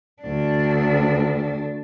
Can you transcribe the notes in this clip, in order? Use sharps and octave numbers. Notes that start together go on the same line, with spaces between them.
D2 D4